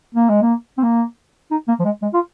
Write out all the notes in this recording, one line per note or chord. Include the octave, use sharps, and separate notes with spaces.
A#3
G#3
A#3
C4
A#3
D#4
A#3
F3
G#3
G#3
F4